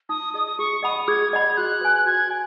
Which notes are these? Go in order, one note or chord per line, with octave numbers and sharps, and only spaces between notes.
D#4 D#6
G#4 D#5 D#6
D#6
G#4 C#6
D#5 F#5 B5 D#6
G#4 G#6
D#5 F#5 B5 G#6
F#4 F#6
B4 G#5
F#4 G#6
G#5